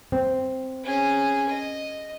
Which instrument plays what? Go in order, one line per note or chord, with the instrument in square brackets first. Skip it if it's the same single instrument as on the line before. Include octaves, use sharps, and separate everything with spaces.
[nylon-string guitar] C4
[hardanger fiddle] C#4 G#4
D#5